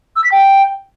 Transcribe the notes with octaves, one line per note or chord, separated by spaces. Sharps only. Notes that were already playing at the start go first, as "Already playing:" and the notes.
E6
B6
G5